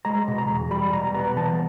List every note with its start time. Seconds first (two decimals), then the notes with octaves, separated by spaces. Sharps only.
0.05 G#3 A#5
0.28 B2
0.38 A#5
0.49 E2
0.71 G3 B5
0.93 B2 A#5
1.14 B3 A#5
1.37 E3 A5